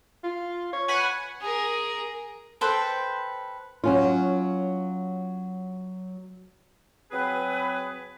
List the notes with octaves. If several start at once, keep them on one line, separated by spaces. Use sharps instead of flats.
F4
C#5
B4 F#5 G#5
G#4 A#4
A4 B4 C5 G5
F#3 C#4 F4
F#3 C4 G#4 B4